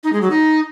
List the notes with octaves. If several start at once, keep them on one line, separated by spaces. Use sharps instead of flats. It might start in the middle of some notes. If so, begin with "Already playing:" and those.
D#4
G#3
F#3
D#4